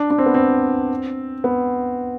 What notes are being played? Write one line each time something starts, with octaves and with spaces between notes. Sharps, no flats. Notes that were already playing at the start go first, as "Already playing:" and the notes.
Already playing: D4
D4
C4
B3
C4
B3